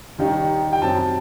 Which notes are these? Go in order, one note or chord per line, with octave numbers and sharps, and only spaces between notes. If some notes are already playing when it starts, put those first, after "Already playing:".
D#2 D#3 G3 D#4
G5
F#2 F#3 C4 A5